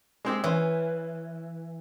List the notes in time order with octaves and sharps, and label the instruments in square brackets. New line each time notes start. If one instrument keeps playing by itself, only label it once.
[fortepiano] G#3 C4 G4
[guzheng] E3 [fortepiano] C#4 C5